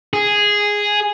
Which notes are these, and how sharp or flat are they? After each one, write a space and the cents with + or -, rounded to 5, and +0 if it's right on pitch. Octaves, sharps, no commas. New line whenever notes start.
G#4 -5